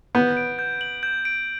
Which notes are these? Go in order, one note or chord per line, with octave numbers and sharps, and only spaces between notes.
B3 G6
D7
G6
F#7
G6
D7